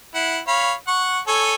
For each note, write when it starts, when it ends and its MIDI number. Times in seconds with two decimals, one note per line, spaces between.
0.15 0.38 64
0.15 0.38 78
0.48 0.73 73
0.48 0.73 77
0.48 0.73 83
0.88 1.19 78
0.88 1.19 85
1.28 1.55 69
1.28 1.55 73
1.28 1.55 80